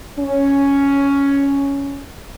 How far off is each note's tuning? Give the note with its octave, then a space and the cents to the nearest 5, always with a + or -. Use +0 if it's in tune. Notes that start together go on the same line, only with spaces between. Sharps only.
C#4 +5